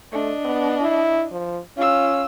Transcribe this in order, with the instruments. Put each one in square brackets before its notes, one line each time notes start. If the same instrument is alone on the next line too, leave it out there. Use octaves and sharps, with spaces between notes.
[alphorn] A3 [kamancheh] D4 D#5
[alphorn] B3
E4
F3
[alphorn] C#4 [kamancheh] F4 E6